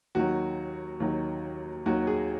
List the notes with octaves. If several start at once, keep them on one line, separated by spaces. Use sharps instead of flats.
D#2 D#3 F#3 F#4
D#2 D#3 F#3
D#2 D#3 F#3 F#4
G#4